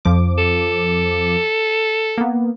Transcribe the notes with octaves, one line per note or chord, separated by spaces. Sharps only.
F2 F3 D6
A4
A#3 B3